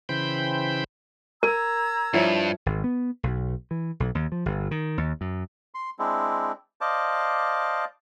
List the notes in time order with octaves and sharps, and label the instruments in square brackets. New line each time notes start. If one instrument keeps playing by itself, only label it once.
[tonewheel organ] C#3 E3 C5 G5 B5 G6
[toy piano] A#4 [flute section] A#5 E6 G#6
[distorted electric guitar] G2 [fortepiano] F3 E4 C#5
[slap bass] G#1
B3
B1
E3
B1
D#2
F3
G1
D#3
D#2
F#2
[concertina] C6
G#3 C4 D4 E4
C5 D5 D#5 F5 A5 D6